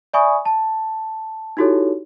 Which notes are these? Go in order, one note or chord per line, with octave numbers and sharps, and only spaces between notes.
D5 E5 G#5 B5 C#6 D#6
A5
D#4 E4 F#4 G4 A4 C#5